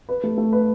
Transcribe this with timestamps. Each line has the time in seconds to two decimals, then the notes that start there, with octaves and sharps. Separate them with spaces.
0.09 B4
0.23 A3
0.38 A3
0.53 B4